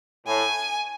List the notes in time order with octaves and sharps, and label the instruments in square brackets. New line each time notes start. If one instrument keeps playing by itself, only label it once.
[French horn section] A2 [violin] G#5